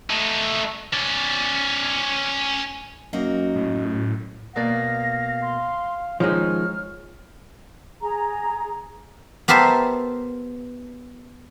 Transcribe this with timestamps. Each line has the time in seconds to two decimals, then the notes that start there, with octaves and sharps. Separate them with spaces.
0.10 A3 D#4
0.93 C#4 D5
3.13 F#2 A#3 D#4 F#4
3.56 A2
4.56 B2 A#3 D5 F5 A#6
5.42 C6
6.20 D#3 F3 G#3 C#4 D#4 C#5 F6
8.01 G#4 A#5
9.48 B3 G4 A#4 C5 E5 A5